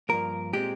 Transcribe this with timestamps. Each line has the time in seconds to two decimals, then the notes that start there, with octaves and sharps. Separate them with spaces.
0.09 G2 F3 A#3 A#4
0.53 A#2 G#3 C4 G4